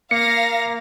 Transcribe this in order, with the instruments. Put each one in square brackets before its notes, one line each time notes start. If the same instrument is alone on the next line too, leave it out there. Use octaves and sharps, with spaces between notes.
[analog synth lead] A#3 [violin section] F5 A#6 [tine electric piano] C#7